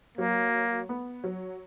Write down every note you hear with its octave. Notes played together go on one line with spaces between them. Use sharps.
F#3 A#3
B3
F#3